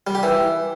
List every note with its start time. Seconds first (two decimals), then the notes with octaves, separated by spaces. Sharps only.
0.07 G3
0.15 G4
0.23 E3